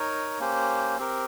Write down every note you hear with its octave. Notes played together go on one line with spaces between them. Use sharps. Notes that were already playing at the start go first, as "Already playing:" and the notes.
Already playing: D#4 A#4 C#5
A#3 C#4 G4 C5
C4 G4 A#4